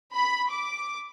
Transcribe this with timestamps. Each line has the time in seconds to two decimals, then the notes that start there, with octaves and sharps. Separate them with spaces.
0.14 B5
0.51 D6